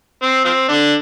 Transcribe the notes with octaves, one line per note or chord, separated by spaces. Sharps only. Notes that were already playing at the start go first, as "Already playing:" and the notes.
C4
F3 C4
D3 D4